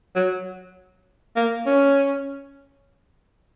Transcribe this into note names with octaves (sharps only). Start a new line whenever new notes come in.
F#3
A#3
C#4